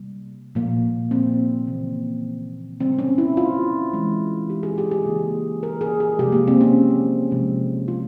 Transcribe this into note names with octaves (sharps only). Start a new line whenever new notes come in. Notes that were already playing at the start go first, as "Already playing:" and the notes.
Already playing: C3 G3 A#3
A#2 F3 A#3
C4
C#3 E3 A#3
C#3 G3 A#3 C4
C#4
E4
F4
E3 G#3
G4
G#4
G4
G#4
C#3 E3 A#3
A#4
G#4
G#4
C3 F3 G#3 G4
A#3
C4
C#4
C3 F3 G#3
F4